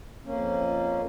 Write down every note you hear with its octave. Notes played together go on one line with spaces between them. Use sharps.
F2 A#3 C#4